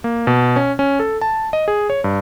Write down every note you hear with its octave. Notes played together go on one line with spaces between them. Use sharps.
A#3
B2
C#4
C#4
A4
A5
D#5
G#4
C#5
G2